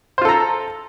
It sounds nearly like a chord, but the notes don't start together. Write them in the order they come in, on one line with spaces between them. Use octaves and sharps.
C5 F4 A4 A#5